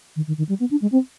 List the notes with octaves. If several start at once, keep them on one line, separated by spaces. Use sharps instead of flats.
D#3
D#3
D#3
G3
B3
D4
G#3
C4